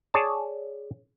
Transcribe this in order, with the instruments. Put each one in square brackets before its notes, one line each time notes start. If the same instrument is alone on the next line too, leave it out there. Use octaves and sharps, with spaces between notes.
[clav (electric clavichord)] G#4 C#5 D5 A5